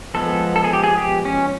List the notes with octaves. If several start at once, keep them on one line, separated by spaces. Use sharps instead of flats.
F3 G#3 B3 A4
A4
G#4
G4
G#4
G4
C#4